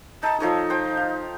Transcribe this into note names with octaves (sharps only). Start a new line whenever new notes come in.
D#4 A5
F3 D#4 A4 C#5
C5 G5
F5